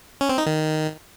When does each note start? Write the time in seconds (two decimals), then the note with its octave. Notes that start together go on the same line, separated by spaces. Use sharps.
0.21 C#4
0.29 C4
0.38 D#4
0.46 D#3